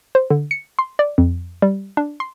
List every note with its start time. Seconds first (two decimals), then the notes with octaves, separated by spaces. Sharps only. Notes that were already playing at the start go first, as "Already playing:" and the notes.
0.15 C5
0.30 D3
0.51 C#7
0.79 C6
0.99 D5
1.18 F2
1.62 G3
1.97 D4
2.20 C6